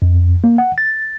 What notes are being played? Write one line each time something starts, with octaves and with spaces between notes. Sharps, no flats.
F2
A#3
F#5
A6